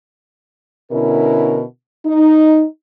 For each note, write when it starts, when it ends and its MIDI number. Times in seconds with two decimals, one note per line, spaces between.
0.91 1.62 47
0.91 1.62 50
0.91 1.62 61
0.91 1.62 64
0.91 1.62 70
2.06 2.63 63